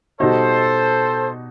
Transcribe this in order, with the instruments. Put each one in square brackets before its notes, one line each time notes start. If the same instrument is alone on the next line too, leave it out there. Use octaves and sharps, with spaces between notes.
[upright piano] B2 G3 D#4 F#4 [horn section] A4 C5